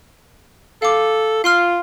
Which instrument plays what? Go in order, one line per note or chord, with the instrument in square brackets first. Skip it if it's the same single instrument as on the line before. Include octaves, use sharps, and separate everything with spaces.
[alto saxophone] A4 [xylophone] F5 D6
[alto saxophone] F4 [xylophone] F5 C6 F6